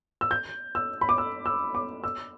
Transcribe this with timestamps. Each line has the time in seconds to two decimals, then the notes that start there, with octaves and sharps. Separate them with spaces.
0.21 E6
0.31 G6
0.75 E6
1.01 B5
1.09 D6
1.18 E6
1.46 E6
1.75 D6
2.04 E6